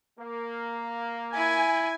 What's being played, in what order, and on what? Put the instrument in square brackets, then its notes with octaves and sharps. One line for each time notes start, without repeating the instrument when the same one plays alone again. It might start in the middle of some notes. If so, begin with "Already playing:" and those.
[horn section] A#3
[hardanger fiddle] E4 [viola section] G#5